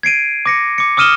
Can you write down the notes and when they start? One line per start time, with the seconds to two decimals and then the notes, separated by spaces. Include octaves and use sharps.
0.03 G#6 C7 D7 D#7
0.46 D6 A#6 C#7
0.78 D6 C#7
0.97 D6 D#6 F6 D#7 E7 G7